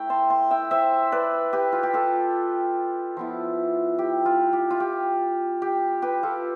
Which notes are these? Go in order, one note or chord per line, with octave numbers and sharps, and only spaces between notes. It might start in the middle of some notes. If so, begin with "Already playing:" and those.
Already playing: A3 E4 G5
A5 C6
A5 C6
E5 G5
C5 E5
B4 D5
G4 B4
F4
G4
F4 A4
F3 B3 E4
G4
F4
G4
F4
G4
G4
G4 B4
F4 A4